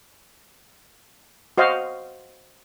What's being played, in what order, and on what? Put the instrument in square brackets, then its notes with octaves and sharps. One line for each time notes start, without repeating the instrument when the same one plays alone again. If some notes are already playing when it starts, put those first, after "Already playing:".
[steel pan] F#4 C5 D#5 F5